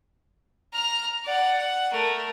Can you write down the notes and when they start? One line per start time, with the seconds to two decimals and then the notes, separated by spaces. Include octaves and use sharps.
0.73 A#5 F6
1.25 D5 F#5
1.58 F#5
1.92 A3 A#4